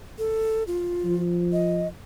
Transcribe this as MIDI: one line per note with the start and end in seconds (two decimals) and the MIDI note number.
0.18 0.63 69
0.67 1.22 65
1.04 1.88 53
1.53 1.88 75